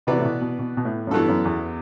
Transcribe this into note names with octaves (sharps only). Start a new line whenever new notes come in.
C3 E3 B3 F#4 B4 D5
A2
B2
B2
B2
B2
A2
F#2
G2 E3 B3 F#4 A4
F#2
E2